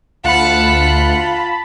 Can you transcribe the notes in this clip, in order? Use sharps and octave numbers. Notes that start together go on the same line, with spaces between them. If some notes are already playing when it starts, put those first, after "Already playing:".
D2 F4 F#5 A5 B5